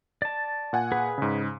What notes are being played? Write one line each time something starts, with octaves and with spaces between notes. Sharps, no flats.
D5 A5
A#2 F#5 G#5
G#4 B4
G#2 C#3